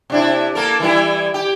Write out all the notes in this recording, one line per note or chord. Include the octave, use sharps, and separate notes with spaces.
C3 D4 E4
A#3 A4 A#4
E3 G3 E4
G4